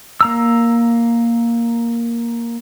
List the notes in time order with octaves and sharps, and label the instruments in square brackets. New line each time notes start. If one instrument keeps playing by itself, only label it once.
[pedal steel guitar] A#3 A#5 E6